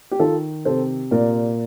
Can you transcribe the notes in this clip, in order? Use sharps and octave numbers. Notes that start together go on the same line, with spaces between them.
G4
D#3 F4 A4
C3 A4 C5
A#2 A#4 D5